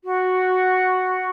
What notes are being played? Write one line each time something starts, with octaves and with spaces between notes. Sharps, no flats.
F#4